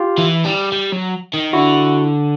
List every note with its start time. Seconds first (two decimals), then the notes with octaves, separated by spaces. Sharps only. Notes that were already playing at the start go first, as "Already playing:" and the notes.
Already playing: F4 G4
0.18 E3
0.45 G3
0.72 G3
0.92 F#3
1.33 D#3
1.53 D3 E4 F#4